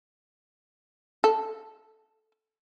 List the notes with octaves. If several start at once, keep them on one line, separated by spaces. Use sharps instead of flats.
A4